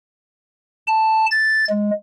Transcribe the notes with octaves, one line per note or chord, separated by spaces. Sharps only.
A5
A6
G#3